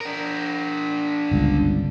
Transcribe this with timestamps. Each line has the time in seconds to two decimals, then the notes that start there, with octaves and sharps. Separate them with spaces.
0.01 D4 A#4
1.31 G1 C#2